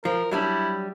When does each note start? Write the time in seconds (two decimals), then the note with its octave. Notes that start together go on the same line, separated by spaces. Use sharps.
0.05 F3 A#4
0.31 F#3 G3 D4 E4